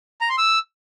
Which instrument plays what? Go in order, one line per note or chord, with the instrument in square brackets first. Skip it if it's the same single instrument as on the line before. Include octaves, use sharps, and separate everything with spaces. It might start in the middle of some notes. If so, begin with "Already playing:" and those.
[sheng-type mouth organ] A#5
C6
E6